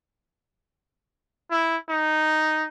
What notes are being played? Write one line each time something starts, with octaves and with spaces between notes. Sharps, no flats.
E4
D#4